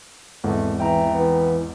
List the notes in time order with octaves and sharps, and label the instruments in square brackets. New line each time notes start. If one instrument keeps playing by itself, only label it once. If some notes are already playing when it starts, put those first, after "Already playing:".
[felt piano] G#1 E2 G#2 [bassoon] A3
[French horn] E3 [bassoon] E4 [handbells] G5 A#5
[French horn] E3 [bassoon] B3